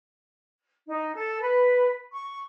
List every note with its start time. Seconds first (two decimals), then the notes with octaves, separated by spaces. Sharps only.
0.87 D#4
1.15 A4
1.41 B4
2.12 C#6